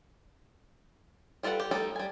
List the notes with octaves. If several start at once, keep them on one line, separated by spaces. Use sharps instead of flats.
G3 F4 A4 B4 F#5
G4
G3 A3 D#4 A4 A#4
G3 G#5